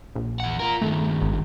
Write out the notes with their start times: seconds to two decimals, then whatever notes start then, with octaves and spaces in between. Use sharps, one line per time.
0.15 A#1
0.40 E2 F#5
0.60 F4 A#4
0.82 G2 D#3 A3
1.22 G#1